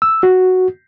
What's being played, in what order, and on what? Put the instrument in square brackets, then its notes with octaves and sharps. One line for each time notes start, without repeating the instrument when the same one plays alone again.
[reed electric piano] E6
F#4